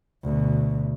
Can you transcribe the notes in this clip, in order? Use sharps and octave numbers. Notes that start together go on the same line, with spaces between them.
D2 B2